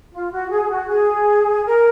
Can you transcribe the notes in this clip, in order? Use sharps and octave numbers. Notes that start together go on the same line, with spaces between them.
F4
F#4
G#4
F#4
G#4
A#4